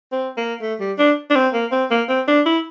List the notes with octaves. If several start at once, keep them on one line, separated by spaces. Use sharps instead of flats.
C4
A#3
A3
G3
D4
D4
C4
A#3
C4
A#3
C4
D4
E4